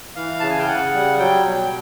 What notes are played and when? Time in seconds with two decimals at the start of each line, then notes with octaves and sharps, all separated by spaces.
0.16 E3 F5
0.40 C#3 A5
0.50 G#5
0.59 G5
0.68 C#3 F#5
0.94 G3
1.19 F#3 G5
1.46 B2